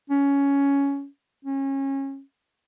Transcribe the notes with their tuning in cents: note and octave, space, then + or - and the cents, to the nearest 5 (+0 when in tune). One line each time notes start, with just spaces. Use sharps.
C#4 +10
C#4 -25